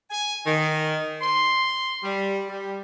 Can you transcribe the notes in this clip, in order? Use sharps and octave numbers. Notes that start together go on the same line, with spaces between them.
G#5
D#3
C6
G3
G3